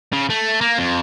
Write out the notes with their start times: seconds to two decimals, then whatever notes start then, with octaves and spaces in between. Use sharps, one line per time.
0.12 C#3
0.30 A3
0.61 A#3
0.78 F2